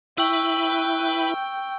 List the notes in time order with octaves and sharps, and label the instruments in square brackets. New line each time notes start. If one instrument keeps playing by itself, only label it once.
[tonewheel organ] E4 [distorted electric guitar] B4 B5 [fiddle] G5 [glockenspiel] C#6 E6